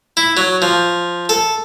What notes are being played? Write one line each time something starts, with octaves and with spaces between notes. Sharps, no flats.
E4
F#3
F3
A4